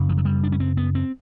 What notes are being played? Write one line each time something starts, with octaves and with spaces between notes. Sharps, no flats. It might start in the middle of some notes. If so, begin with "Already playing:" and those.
Already playing: F#2 C#3
F3
F#3
G3
D4
C#4
C4
B3
C4